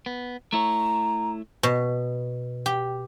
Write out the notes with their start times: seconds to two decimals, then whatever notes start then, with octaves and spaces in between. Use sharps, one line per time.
0.06 B3
0.53 A3 E4 C#5 A#5
1.63 B2
2.66 G4